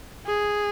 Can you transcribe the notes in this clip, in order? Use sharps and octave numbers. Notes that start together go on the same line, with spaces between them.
G#4